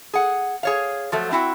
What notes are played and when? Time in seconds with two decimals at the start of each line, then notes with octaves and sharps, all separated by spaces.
0.13 G#4 F#5
0.63 G#4 C#5 F5
1.12 F3 F#3 A3
1.31 C4 E4 F#4 G5